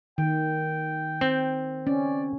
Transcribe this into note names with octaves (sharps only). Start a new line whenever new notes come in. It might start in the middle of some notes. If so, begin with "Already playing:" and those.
D#3 G5
C4
C#4 D5